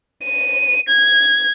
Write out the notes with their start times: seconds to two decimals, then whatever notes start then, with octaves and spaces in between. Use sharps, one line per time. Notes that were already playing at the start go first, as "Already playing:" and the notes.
0.24 D#7
0.89 G#6